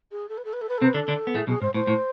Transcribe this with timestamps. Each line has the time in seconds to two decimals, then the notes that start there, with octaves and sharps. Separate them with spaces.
0.11 G#4
0.28 A4
0.37 B4
0.44 A4
0.53 B4
0.61 A4
0.69 B4
0.78 A4
0.81 C3 C4
0.85 B4
0.94 D3 D4 A4
1.08 D3 D4
1.27 B3
1.34 A2 A3 G#4
1.47 B1 B2 G#4
1.61 G#2 C5
1.74 A2 C5
1.87 A2